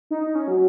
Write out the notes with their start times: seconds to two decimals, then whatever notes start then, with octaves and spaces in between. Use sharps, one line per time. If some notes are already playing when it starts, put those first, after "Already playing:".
0.11 D#4
0.23 D#4
0.35 C#4
0.48 F#3